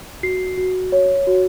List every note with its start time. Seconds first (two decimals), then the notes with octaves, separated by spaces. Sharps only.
0.23 F#4 C7
0.57 F#4
0.92 C#5
1.27 F#4